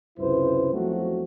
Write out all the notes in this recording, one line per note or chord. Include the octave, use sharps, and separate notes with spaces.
C#2 F#2 C3 E4 B4 C5
E2 F3 F#3 A3 C4 F#4